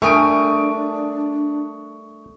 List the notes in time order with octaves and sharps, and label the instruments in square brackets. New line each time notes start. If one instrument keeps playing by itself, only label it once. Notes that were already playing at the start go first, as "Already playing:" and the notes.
[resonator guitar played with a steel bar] G3 A#4 G#5 [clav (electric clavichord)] A3 [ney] D4 [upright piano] C#6 D#6 D7